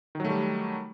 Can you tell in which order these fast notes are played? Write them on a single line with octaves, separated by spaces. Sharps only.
D#3 F#3 A3 G3